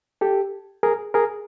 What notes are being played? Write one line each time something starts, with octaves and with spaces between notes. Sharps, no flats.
G4 A4
G#4 A#4
G#4 A#4